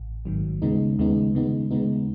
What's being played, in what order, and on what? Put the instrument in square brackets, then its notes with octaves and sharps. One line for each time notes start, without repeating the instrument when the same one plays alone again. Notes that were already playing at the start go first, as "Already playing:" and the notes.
Already playing: [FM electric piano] A1
A1 G#2 D#3 F#3
D#2 C#3 G#3 B3 D#4
D#2 C#3 G#3 B3 D#4
D#2 C#3 G#3 B3 D#4
D#2 C#3 G#3 B3 D#4